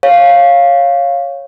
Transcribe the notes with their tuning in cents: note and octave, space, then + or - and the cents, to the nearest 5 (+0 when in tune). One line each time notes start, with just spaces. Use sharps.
C#5 -5 F5 +0